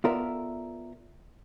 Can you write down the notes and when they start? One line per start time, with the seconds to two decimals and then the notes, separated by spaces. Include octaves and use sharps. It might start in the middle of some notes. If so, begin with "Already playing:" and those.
0.04 B3 F4 A4 A#4 D5 E5